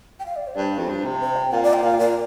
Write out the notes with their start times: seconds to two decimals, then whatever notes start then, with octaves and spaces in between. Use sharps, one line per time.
0.19 G5
0.26 F5
0.36 D5
0.47 C5
0.55 G2 D5
0.63 C5
0.79 F2
0.89 G2
1.05 C3
1.20 C5
1.36 G5
1.52 A#2 F5
1.63 D5
1.73 G5
1.83 A#2 F5
1.99 A#2 D5